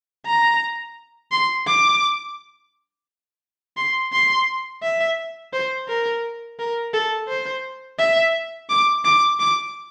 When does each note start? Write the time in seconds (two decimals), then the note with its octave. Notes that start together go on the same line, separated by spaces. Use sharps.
0.27 A#5
1.32 C6
1.67 D6
3.77 C6
4.13 C6
4.83 E5
5.53 C5
5.88 A#4
6.59 A#4
6.94 A4
7.28 C5
7.99 E5
8.69 D6
9.05 D6
9.40 D6